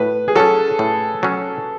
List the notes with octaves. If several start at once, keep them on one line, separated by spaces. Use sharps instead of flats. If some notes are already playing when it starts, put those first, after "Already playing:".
Already playing: A2 B4
G#4
F#3 C#4 A4
A2
F#3 C#4